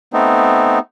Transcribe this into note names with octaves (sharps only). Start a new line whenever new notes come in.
A3 B3 C4 D#4